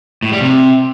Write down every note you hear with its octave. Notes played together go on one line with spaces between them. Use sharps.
A2
G3
C3